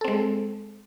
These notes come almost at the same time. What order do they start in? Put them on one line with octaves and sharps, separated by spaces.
A4 C4 G#3